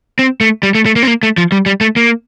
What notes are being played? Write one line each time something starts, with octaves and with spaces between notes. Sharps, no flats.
C4
A3
G3
A3
A3
A#3
C4
A#3
A3
F3
G3
G3
A3
A#3